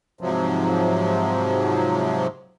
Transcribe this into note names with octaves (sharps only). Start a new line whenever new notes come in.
G#2 C3 F3 F#3